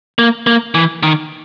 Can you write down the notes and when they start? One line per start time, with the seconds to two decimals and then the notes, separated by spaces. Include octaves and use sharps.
0.19 A#3
0.47 A#3
0.75 E3
1.03 D#3